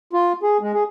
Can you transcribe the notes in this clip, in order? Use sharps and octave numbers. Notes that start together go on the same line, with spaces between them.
F4
G#4
G#3
G#4